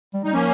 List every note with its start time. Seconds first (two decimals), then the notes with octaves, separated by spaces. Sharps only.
0.14 G3
0.24 G3 D#4
0.33 F3 A#3 C#4